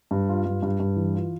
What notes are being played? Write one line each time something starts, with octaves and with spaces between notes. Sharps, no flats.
G2
F4
G2
G2
G2
E3
F4